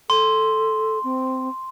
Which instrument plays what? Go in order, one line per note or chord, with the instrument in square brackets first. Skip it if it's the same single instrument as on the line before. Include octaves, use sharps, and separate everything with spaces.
[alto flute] A4 [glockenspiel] C6
[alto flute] C4